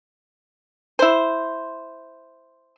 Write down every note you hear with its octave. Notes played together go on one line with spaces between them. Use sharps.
E4 C5